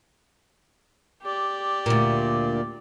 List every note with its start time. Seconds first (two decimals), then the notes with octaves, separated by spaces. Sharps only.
1.23 G4 D5
1.86 D2 A#2